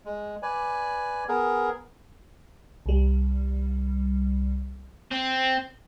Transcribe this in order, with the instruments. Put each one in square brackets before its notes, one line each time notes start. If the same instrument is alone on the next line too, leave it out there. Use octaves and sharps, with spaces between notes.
[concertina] G#3
B4 D5 G#5
B3 G#4 A#4
[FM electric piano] C2 G3
[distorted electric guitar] C4